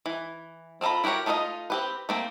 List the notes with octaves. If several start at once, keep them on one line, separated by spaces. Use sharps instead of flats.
E3
C4 F4 A4 A#5 B5
E4 F#4 G4 A#4 C#5
A3 D#4 F4 B4 D#5
C4 G4 B4
A3 A#3 C4